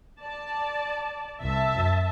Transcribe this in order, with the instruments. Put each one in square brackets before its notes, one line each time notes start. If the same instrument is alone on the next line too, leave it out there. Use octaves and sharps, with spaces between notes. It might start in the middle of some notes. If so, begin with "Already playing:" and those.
[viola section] D5 A5
[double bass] C2 [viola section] E5 A5
[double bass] F#2